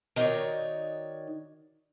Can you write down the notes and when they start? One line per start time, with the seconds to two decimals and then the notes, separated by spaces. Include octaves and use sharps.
0.16 D#3 D#4 E4 F#4 C#5 D5